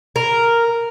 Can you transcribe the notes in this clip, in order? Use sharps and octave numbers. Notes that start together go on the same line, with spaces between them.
A#4